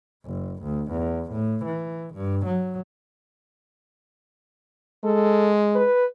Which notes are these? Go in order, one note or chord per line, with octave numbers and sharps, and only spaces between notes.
F#1
D2
E2
A2
E3
G2
F#3
G#3 A4
B4